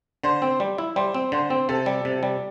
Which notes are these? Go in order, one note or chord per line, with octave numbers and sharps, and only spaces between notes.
D3 C5
C4
G3
E4
G3 C5
C4
D3 C5
C4
C3 A4
G3
C3
G3